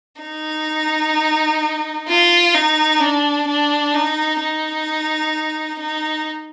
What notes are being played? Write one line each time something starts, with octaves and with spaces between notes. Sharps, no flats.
D#4
F4
D#4
D4
D4
D#4
D#4
D#4